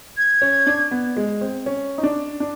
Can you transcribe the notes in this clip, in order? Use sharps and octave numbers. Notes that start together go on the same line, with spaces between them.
G#6
C#4
D4
B3
G#3
C4
C#4
D#4
D4
D4